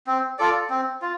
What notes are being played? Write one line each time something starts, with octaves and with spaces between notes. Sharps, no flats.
C4
F4 A4 D5
C4
F4